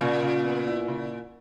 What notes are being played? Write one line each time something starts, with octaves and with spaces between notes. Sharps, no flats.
A#2 C#3
C#3
B3
E4
C#3